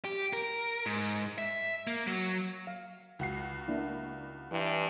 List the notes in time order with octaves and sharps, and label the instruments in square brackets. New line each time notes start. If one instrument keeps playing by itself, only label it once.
[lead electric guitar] G4
A#4
G#2
E5
A#3
F#3
[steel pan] F5
[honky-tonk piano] C#2 F#4 C7
[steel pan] A#3 D4 E4
[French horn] G2 [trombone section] E3